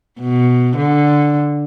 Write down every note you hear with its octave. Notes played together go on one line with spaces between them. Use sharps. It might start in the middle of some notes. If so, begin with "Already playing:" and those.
B2
D3